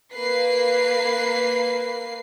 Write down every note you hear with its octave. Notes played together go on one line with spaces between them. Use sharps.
A#3 B4 C7